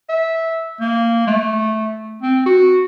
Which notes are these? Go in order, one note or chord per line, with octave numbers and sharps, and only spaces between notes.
E5
A#3
A3
C4
F#4